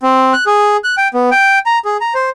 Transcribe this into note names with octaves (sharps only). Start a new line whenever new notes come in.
C4
F#6
G#4
F#6
G5
B3
G5
A#5
G#4
A#5
C5